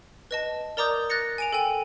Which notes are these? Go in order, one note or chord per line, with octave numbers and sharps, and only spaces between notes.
B4 D#5 A5
A#4 D5 A#5 D6 D#6 G6
F#6 A6 A#6 C#7
G#5 D7 F7
A4 G5 G#5